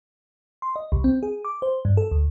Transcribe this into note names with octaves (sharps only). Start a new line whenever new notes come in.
C6
D#5
C2
C4
G#4
D6
C5
G2
A4
D2